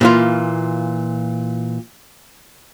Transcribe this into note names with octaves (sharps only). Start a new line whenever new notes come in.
A#2 E3 F4